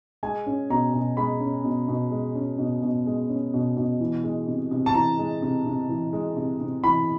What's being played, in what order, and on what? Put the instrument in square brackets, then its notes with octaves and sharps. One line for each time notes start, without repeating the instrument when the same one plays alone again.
[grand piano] G#3 G#5
C#4
B2 A#5
B2
G#3 B5
C#4
B2
B2
G#3
C#4
B2
B2
G#3
C#4
B2
B2
E3
G#3
C3
C3
A5
E3 A#5
G#3
C3
C3
E3
G#3
C3
C3
E3 B5